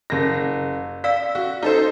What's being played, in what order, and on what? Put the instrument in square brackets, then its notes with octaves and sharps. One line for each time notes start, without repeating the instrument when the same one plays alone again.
[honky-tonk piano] F#1 A#6
[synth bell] D5 F5 E6 [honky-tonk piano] B6
[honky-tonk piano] F#4
D#4 A4 C5